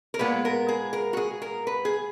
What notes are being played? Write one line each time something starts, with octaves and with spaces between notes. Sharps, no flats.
A#4
A#2 G#3 B3 B4
A#4
G#4
A#4
F#4
G#4
A#4
B4
G#4